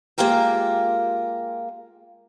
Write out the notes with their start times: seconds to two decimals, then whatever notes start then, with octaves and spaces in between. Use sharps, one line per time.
0.18 G#3 A#3 F4 G4 A#4 G5